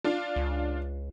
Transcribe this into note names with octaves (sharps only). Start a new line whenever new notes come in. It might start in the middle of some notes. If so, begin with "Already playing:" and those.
D4 F4 F5
C#2